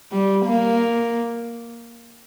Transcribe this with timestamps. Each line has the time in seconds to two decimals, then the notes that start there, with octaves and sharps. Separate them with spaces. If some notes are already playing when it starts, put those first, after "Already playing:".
0.12 G3
0.45 A#3